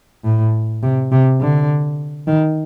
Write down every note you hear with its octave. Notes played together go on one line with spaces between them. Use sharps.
A2
C3
C3
D3
D#3